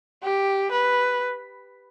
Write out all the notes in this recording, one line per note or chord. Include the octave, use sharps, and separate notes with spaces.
G4
B4